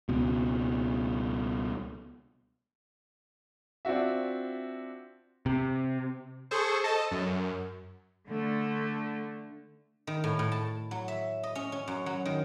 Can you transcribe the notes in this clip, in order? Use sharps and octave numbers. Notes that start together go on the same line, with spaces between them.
C#2 B2
C4 D4 F4 F#4 E5
C3
G#4 A4 C5 C#6
A4 D#5 A5
F#2
D3 A3
D#3
A2
A2
A5
F#3
E5
D#5
C#4
C#4
F#2
F#3
D#3